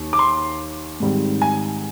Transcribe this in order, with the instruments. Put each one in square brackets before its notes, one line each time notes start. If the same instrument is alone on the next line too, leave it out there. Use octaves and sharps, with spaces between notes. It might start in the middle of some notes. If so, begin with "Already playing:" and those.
Already playing: [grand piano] D#2 D#3
D6
C6
G#2 D#3 G3 C4
G#5